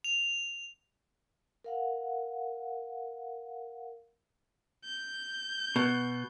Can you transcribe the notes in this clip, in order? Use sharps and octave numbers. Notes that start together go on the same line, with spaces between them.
F7
A#4 F5 F#5
G6
B2